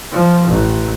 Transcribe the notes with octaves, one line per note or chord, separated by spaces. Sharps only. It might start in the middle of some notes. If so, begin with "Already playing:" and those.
F3
A1